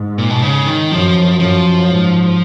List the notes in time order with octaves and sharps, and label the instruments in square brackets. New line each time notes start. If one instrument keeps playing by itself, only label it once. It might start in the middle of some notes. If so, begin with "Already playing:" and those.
Already playing: [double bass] G#2
[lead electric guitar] A#2
B2
C#3
D#3
[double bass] F#2 [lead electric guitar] F3
[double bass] F#2 [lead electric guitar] F3
[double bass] G#2